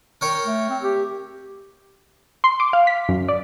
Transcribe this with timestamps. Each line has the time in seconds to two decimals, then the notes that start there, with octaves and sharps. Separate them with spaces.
0.21 A#4 C#5 G5
0.46 A3
0.70 C4
0.82 G4
2.44 C6
2.60 D6
2.73 F5
2.87 B6
3.09 F#2
3.28 D5